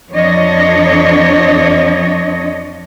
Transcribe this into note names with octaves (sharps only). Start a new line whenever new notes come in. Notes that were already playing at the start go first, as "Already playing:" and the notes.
F2 F3 D4 C#5 D#5